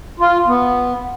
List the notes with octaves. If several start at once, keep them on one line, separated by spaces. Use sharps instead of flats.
F4
B3